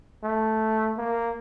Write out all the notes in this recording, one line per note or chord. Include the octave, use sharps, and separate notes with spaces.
A3
A#3